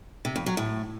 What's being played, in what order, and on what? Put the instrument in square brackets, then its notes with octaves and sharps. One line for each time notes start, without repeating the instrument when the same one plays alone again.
[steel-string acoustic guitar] C3
F2
F#3
A2